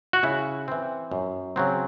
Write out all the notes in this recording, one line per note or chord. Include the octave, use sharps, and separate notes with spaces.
F#4
C#3 E4
E3 C4
F#2
C#3 F#3 C4